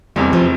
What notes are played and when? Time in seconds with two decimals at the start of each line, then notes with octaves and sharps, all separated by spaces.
0.16 F1 E2 C3 G3
0.33 F3